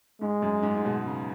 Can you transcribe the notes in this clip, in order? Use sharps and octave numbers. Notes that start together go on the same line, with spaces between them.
G#2 G#3
F#2
G#2
G#2
B2
C#3